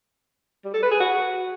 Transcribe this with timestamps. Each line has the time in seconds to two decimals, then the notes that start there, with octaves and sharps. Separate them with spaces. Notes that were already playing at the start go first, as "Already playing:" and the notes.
0.65 G3
0.74 A4
0.83 B4
0.92 G#4
1.00 F#4